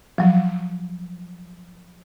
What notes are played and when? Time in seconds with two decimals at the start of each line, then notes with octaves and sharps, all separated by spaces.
0.18 F3 F#3